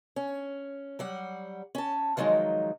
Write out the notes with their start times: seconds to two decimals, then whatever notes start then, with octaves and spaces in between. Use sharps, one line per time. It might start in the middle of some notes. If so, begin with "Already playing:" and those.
0.16 C#4
0.99 F#3 G3 F#5
1.75 C#4 A5
2.17 D#3 F3 F#3 G#3 D#4